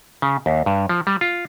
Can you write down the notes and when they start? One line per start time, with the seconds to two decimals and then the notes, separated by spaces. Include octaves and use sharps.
0.22 C#3
0.46 D#2
0.66 G2
0.89 F3
1.07 G3
1.21 F4